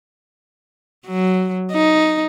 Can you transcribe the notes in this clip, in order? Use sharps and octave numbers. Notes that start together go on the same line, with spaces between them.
F#3
D#4